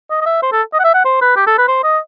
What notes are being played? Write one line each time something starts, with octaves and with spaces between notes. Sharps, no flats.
D#5
D#5
E5
C5
A4
D#5
F#5
E5
F#5
C5
B4
G4
A4
B4
C5
D#5